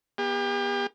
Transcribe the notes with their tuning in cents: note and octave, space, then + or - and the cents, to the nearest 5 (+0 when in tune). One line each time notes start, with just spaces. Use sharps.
B3 -30 G4 +40